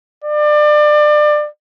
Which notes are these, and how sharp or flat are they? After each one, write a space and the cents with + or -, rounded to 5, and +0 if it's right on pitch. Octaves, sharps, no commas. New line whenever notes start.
D5 +30